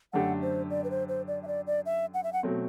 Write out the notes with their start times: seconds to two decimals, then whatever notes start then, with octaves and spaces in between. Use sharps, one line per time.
0.13 F#2 D3 A3 D4 G4 F#5
0.42 C5
0.70 D5
0.84 B4
0.90 C5
1.09 C5
1.28 D5
1.43 E5
1.47 D5
1.67 D5
1.86 E5
2.14 F#5
2.24 E5
2.33 F#5
2.43 B2 F#3 A3 C4